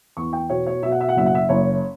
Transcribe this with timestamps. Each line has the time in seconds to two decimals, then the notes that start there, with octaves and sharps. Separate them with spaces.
0.17 E2 C#6
0.33 G5
0.49 B2 C#5
0.66 C#5
0.83 B2 E5
0.92 F#5
1.00 E5
1.09 F#5
1.16 F#1 E5
1.26 F#5
1.35 E5
1.49 F#1 C#5